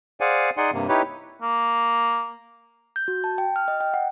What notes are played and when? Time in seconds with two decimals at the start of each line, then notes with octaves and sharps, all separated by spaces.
0.20 G#4 C5 D5 F5 F#5 G#5
0.57 D#4 G#4 D5 F#5 G#5 C6
0.73 G2 C3 A#3
0.89 D#4 E4 G4 B4 C#5
1.42 A#3
2.96 G6
3.08 F#4
3.24 A5
3.38 G5
3.56 F6
3.68 D#5
3.81 G5
3.94 F#5